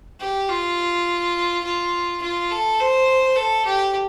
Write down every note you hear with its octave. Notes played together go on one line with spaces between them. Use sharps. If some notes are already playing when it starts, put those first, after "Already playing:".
G4
F4
F4
F4
A4
C5
A4
G4